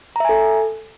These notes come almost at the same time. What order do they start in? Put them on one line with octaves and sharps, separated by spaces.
A#5 E5 G#5 A4